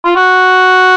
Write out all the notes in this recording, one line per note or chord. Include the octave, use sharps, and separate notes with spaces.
F4
F#4